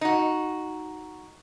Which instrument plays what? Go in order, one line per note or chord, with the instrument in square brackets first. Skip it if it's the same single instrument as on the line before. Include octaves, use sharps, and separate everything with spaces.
[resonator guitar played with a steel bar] D#4 F#4